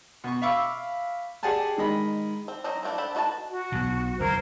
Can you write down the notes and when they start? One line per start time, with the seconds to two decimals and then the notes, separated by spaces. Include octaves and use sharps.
0.24 B2 C#6
0.42 E5 F5 B5 C#6 D6 E6
1.43 G4 G#4 D5 F#5 G#5 A5
1.77 D#3 G#3 D#5 B5
2.48 C4
2.64 F#3 C4 C#4 D#4
2.83 F3 A3 C4 D4 E4
2.98 D4 A4 C5 A5 B5
3.15 D#4 F#4 B4 F5 A5
3.52 F#4
3.72 B1 B2
4.20 F#1 D#2 A#4 C5 G#6